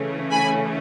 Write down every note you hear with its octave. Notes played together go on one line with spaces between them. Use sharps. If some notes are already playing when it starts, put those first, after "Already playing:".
Already playing: C#3 E3 A3 C#4
G#5 B5